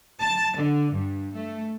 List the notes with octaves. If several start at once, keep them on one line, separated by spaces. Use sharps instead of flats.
A5
D3
G2
A3